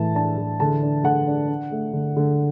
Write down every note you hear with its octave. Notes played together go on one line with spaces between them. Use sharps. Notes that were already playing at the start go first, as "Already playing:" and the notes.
Already playing: A2 E3 A5
D4 A5
E3
D3 A5
D4
D3 F#5
D4
D4
A3
D3
D3